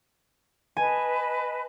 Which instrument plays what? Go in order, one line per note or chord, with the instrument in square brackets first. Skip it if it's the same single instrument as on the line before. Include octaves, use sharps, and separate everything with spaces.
[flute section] B4 D#5 A5 [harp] G#5